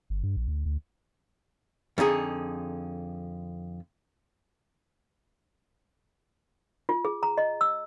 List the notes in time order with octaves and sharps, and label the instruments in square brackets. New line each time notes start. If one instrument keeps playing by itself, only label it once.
[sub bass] G1
G2
A#1
D2
D2
[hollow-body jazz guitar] F2 D3 D#4 G#4
[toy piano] F4
G#4
A#5
D#5
E6